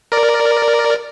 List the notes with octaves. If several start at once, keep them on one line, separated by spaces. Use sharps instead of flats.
A#4 D5